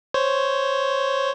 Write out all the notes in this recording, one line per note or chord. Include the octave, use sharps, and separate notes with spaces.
C5 C#5